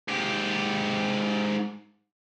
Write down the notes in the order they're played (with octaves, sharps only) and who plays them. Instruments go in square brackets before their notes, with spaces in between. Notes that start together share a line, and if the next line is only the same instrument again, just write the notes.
[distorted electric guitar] G#2 G4